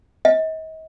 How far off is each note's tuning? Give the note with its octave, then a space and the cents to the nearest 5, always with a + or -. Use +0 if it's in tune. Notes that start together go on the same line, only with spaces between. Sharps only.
D#5 +40